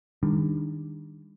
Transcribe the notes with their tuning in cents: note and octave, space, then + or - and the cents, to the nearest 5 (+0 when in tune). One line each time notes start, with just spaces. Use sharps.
D#3 +0 G3 +40 D4 +0